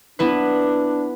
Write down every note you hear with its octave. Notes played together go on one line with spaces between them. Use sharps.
B3 D4 E4 B4